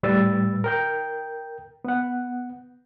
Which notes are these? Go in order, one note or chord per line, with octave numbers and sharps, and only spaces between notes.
A2 G3 B4 E6 A6
A#4 G5 G6
B3 F#5